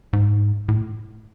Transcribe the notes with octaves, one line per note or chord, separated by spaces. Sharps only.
G#2
A2